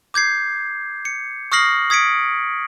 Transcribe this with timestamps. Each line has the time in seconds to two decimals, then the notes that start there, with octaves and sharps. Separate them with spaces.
0.14 D6 G6 G#6 C7
1.05 C#7
1.52 C#6 D#6 F6 A#6 C7 F#7
1.90 D#6 G#6 B6 C#7 D7